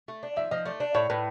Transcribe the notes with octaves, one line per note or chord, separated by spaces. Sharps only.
A3
D4
F3 E5
F3 D#5
A3 D5
D4
A2 C#5
A2 B4